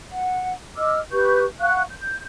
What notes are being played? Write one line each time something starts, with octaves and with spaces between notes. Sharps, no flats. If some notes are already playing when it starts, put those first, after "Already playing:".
F#5
D#5 D6 E6 F6
G4 B4 C#6 G6
F5 F#5 C#6 F#6
G6